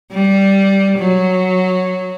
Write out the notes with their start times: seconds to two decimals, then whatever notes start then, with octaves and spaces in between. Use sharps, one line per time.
0.12 G3
0.98 F#3